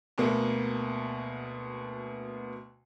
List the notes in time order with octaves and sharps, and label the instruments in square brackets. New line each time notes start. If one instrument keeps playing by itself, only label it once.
[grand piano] D2 B2 A#3 B3